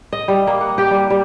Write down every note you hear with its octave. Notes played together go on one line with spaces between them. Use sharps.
D#5
G3
A#3
F#5
G4
G3
G3